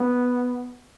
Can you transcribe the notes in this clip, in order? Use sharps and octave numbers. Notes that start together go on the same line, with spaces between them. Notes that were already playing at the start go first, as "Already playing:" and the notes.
Already playing: B3